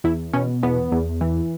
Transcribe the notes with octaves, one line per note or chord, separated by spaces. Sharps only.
E2 E4
B2 C#4
E2 B3
E2
E3